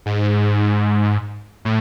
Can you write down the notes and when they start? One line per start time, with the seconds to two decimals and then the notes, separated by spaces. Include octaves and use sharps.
0.06 G#2
1.65 A2